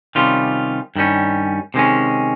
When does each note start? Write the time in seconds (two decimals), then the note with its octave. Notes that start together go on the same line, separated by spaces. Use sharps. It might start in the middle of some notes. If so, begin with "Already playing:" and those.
0.15 C3 D#3 G3 C#4 F4
0.96 G2 D#3 G3 C#4
1.74 C3 D#3 G#3 C#4